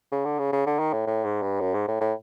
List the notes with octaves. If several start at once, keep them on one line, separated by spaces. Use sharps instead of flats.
C#3
D3
C#3
C#3
D3
D#3
A2
A2
G#2
G2
F#2
G#2
A2
A2